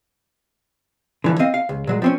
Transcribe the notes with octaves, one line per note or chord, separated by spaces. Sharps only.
D3 E3 F3
C4 D#5 F5
F5
C#2
A#2 F#3 G#3
F3 C4 C#4